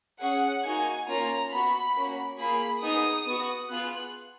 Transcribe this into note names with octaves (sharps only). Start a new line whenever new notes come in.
C#4 G#4 F#5
A#3 D#4 F#4 G#5
A#3 C#4 F4 A#5
B3 F#4 B5
A#3 C#4 F#4
A#3 F4 G#4 B5
B3 D#4 G#4 D#6
B3 F#4
B3 F4 G#4 F#6